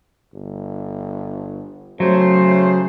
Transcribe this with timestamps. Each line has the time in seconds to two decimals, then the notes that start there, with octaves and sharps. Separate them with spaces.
0.34 G1
2.00 C#3 F#3 A3 C5